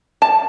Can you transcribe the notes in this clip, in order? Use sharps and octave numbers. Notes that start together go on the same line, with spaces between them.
A5